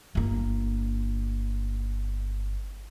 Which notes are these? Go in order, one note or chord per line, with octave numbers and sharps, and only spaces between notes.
G1 A#3